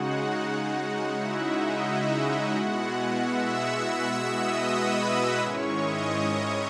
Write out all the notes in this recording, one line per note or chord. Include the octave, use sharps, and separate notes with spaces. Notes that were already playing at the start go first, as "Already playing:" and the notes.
Already playing: C#3 G#3 D#4 F#4 F#5
F#4 F#5
E4 E5
D#4 D#5
E4 E5
B2 G#3 B3 E4 F#4 F#5
F#4 F#5
E5 E6
E5 E6
D#5 D#6
B4 B5
G#2 D#3 G#3 C#4 E4 C#5 C#6
D#5 D#6